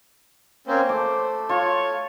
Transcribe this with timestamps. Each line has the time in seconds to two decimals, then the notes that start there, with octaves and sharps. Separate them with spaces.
0.67 A#3 C4 C#4 C5
0.89 A3 D6
1.49 F4 C#5